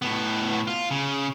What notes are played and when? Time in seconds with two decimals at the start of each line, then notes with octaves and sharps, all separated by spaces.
0.02 A2 B3
0.67 F4
0.91 C#3